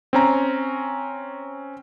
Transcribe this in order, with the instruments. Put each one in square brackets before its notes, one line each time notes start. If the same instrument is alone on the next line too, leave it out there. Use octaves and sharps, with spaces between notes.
[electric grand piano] C4 C#4 A#5